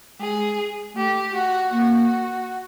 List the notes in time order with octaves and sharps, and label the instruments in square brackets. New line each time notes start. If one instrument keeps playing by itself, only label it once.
[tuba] G#3 [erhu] G#4
[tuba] A3 [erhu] G4
[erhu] F#4
[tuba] A#3 [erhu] F#4